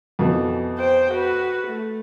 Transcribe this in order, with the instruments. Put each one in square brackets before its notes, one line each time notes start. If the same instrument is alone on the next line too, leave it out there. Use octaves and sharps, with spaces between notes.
[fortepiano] F2 B2 E3
[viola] C5 G5
F#4 B4
A3